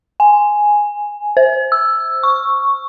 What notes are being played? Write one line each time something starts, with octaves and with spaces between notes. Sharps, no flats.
G#5
C5
E6
C#6